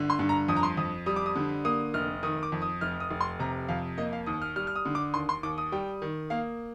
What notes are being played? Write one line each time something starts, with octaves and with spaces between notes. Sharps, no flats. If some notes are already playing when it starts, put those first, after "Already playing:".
Already playing: G1 D3
C6
G2
A#5
F2 D#6
A#5
C6
F2 D#6
G3 D#6
D6
D#6
D3
A#3 D#6
F1 F6
D#3 D#6
D6
F2
D#6
F1 F6
D#6
F1
C6
C3 A#5
F2 F5
A#3 D#5
F5
D#2 D#6
F6
G3 F6
F6
D#6
D3
D6
D#2 C6
C6
D#2 D6
D#6
G3 G5
D#3
A#3 F5